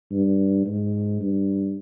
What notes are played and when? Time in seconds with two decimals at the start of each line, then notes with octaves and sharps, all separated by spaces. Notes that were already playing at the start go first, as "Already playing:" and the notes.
0.12 G2
0.66 G#2
1.21 G2